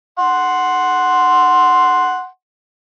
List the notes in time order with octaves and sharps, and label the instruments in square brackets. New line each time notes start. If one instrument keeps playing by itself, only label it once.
[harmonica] F#5 C6